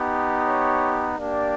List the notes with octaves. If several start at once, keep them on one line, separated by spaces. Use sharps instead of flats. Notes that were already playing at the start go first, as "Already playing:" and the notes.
Already playing: B3 D#4 G4
C#5
A#3 D4 G4 D5